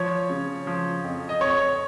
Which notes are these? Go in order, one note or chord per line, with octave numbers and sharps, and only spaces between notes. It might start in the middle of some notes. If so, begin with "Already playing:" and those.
Already playing: F3 C#5
C#3
F3
F2
D#5
F2 C#5